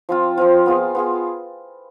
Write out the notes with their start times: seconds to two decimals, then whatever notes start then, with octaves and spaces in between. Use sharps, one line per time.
0.09 F3 C4 F4
0.38 F3 C4 F4
0.66 B3 F4 G#4
0.95 B3 F4 G#4